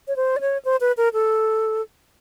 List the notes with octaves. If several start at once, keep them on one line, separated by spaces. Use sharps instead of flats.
C#5
C5
D5
C#5
C5
B4
A#4
A4